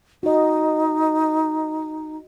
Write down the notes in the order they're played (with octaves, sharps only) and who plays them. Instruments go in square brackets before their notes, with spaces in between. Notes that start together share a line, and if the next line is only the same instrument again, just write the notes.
[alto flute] D#4 [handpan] F#4 D#5